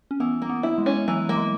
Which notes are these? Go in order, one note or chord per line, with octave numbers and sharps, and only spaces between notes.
C#4
E3 B3
A#3
B3
E4
G#3
C#4
E3 F#3
A#3
G#3